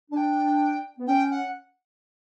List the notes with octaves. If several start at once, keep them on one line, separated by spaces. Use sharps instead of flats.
D4 G5 A5
B3
C#4 G5
F#5